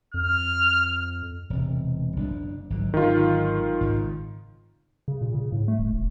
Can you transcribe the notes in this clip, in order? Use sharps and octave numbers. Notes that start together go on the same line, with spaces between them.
F2 F6
E1 C3
F#1 D4
G#1 D3 F#3
D#3 F4
G#1 C#3
C#3
A#2
C#3
A2
A3
D#1
F1